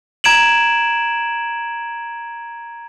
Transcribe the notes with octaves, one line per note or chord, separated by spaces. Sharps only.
A#5 G#6 D7 E7 F#7